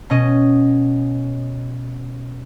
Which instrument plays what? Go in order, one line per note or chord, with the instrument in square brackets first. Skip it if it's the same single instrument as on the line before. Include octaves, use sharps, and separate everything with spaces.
[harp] B2 C#4 D#5